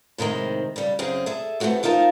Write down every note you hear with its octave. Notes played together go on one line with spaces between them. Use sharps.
A2 C3 D#3 G#3 C4
C#3 G3
F#2 C#3 C4 G#4
G#4 A4 E5
A3 B3 C4 F#4 A4
F3 D#4 F4 A#4 A5